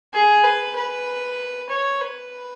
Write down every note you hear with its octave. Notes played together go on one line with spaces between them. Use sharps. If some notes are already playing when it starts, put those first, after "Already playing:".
G#4
B4
B4
C#5
B4